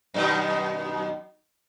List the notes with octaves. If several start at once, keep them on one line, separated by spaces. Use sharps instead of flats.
F#2 B2 D#3